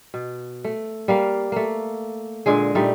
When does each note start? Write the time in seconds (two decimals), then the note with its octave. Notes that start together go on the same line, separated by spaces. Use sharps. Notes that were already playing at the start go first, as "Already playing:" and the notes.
0.14 B2
0.64 A3
1.08 G3 A#3 F5
1.52 A3 A#3
2.46 A#2 D3 G#3 G#4
2.75 A#2 G3 A3 D#4